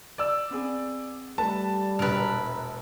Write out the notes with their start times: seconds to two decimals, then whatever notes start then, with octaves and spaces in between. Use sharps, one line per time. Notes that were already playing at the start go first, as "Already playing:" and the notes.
0.18 D5 E6
0.50 B3 C4 G#4
1.38 G3 A3 B4 A5
1.99 E1 A#1 A#4 B4